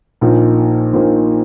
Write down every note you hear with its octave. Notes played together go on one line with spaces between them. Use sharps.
A#1 A#2 A#3 D#4
A#1 A#2 A#3 D#4